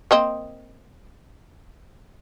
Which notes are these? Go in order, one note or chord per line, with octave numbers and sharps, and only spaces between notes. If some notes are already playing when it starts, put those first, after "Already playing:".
A#3 C4 D#5